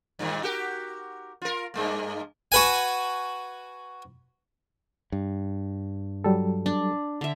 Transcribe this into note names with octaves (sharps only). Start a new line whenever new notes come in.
G2 A#2 D#3
F#4 G4 A#4
F4 A#4
G2 G#3 A#3
F#4 B4 G#5
G2
F#3 G3 A4
D4
D3 E5